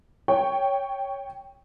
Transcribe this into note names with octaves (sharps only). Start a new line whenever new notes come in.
C#5 G5